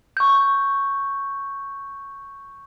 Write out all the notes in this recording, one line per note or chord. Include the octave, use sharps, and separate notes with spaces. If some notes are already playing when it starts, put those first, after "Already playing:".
C#6 G6